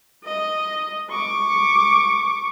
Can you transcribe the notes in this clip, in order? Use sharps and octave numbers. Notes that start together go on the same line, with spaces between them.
D#5
C#6 D6